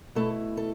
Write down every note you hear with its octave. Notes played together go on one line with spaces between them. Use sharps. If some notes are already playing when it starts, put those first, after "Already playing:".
B2 A3 E4 A4
A4